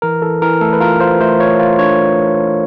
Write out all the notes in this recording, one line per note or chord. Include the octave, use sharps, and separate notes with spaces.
E3 A#4
E3 A4
E3 A#4
A3 A4
B4
F4 A#4
F4 C5
A3 C5
F4 C#5
F4
D4 C#5